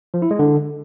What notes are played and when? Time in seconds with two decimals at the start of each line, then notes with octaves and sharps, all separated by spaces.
0.14 F3
0.22 E4
0.31 G#3
0.39 D3